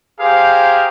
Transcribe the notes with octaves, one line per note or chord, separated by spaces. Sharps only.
G4 G#4 A#4 C5 F5